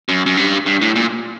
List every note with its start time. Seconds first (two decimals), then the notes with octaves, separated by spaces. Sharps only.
0.09 F#2
0.26 F#2
0.37 G2
0.66 G2
0.81 A2
0.96 A#2